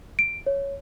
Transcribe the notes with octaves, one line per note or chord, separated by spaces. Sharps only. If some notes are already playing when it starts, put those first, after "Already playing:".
D7
C#5